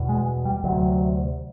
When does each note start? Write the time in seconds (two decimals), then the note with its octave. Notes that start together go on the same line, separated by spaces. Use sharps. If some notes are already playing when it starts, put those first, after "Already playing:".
Already playing: E2 B2
0.09 G#3
0.45 G3
0.64 D2 C3 F#3